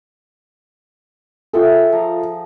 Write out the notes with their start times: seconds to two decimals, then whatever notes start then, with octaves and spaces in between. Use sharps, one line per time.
1.53 F4 G#4 A4 E5 G5
1.92 F3 A#5